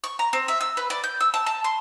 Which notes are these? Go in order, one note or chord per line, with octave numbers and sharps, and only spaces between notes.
C#6
A#5
C4
E5
E6
B4
D5
G6
E6
A5
A5
C6